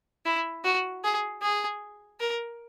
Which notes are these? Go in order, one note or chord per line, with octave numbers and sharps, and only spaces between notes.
E4
F#4
G#4
G#4
A#4